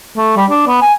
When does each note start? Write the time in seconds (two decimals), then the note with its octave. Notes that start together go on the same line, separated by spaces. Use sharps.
0.17 A3
0.37 G3
0.50 D4
0.68 B3
0.82 G#5